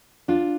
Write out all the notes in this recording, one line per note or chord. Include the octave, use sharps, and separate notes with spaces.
D4 F4